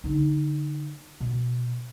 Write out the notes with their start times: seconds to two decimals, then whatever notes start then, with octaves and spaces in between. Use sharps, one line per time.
0.04 D3 D#4
1.20 B2